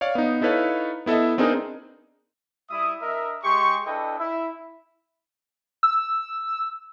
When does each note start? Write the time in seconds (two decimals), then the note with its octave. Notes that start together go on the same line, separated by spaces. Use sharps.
0.01 C#5 D5 F5
0.15 B3 D#4
0.41 D#4 E4 A4 B4 C#5 F5
1.06 B3 E4 A4 D#5 E5
1.38 B3 C4 D4 D#4 G#4 A#4
2.70 G3 E4 E5 D#6
3.01 D4 A#4 D#5 E5
3.44 G#3 G4 G#4 C6 C#6
3.85 D4 E4 A4 B4 D#5 G5
4.18 E4 E5
5.83 E6